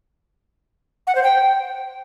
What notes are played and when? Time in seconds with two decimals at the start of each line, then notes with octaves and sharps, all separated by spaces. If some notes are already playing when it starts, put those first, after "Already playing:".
1.07 F#5
1.15 C5
1.24 G5